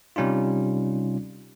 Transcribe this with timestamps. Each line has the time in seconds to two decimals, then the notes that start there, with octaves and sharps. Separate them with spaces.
0.16 C3 G3 C#4 D#4 F4